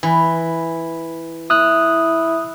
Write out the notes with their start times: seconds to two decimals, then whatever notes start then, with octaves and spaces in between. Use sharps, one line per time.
0.03 E3
1.50 E4 D#6 F#6